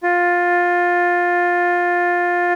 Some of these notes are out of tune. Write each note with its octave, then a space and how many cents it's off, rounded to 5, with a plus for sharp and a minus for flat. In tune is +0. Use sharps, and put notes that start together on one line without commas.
F4 +15